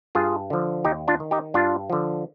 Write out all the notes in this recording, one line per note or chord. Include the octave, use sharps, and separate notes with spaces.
G2 F4 G#4
D3 F3
D#2 D#4 G4
D4 F4
D#3
D#4 G4
G2 D4 F4
D3 F3